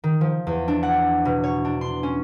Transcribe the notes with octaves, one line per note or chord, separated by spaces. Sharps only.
D#3
F3
E2
D4
F#5
B2
C#5
D4
C6
C#4